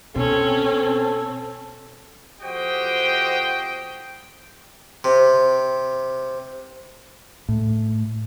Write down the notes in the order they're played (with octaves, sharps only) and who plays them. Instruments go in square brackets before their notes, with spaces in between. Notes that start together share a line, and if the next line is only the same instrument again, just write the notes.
[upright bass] B2 [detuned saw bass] C4 [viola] C#4 [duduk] A4
[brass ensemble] F2 F#4 G4 C5 D#5 G5
[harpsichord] C3
[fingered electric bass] A2